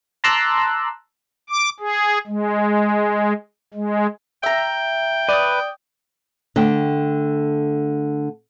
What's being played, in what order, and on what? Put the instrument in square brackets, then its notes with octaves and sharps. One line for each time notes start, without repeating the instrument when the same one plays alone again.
[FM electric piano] A5 A#5 C6 D6 E6 F#6
[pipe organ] D6
G#4
G#3
G#3
[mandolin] E5 A#5 [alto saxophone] G5
[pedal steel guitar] B4 [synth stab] D5 D#6
[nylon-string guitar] D3 A3 G5